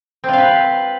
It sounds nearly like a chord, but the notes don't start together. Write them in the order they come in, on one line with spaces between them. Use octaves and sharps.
C4 F4 F5 B4